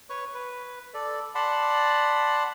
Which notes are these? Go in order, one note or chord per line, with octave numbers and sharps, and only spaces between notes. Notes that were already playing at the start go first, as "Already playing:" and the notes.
B4 C#5 C#6
B4
A4 D5
D5 F#5 A5 B5 C6